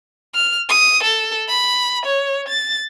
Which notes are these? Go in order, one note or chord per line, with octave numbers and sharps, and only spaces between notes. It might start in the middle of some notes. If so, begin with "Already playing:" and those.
F6
D#6
A4
B5
C#5
A6